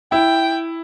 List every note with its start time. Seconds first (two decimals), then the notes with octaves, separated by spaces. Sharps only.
0.12 E4 G5